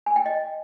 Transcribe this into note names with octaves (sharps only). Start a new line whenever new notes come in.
G#5
G5
D#5